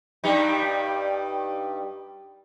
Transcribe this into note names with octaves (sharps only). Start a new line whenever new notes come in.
G2 G3 D#4